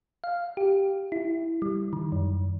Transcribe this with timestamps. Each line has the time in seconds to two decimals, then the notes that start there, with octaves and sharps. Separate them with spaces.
0.24 F5
0.57 G4
1.12 E4
1.62 G3
1.93 D#3
2.12 F#2